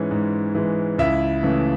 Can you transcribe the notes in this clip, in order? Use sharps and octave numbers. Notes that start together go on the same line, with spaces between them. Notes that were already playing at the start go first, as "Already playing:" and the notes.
Already playing: G#2 E3 G#3 C#4
G#2
E3 G#3
C#2 E4 E5
C#3 E3 A3